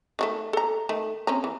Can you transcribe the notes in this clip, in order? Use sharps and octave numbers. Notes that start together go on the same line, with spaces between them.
D#3 F#3 A3
A4 A#5
D#3 A3
C4 C#4 A#5
E3